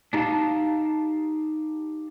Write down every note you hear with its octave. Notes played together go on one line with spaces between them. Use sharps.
D4 D#4 G4 D#5 F5 A5